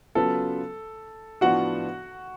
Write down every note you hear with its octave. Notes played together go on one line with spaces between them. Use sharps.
C#3 F#3 B3 F4 A4 B4
A2 F3 B3 D4 F4 F#4 F#5